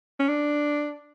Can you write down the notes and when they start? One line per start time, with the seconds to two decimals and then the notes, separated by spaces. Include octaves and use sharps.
0.20 C#4
0.29 D4